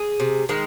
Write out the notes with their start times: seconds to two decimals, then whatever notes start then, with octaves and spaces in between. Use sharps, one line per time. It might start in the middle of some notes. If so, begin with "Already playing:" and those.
Already playing: G#4
0.20 C3
0.49 D#3 G#3